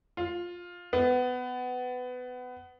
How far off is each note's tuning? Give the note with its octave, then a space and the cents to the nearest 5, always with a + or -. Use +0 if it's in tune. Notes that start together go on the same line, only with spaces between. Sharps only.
F4 +10
B3 +20